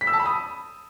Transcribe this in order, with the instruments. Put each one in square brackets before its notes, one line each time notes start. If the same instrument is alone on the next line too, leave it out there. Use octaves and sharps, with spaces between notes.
[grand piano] B6
E6
A5
B5
D#6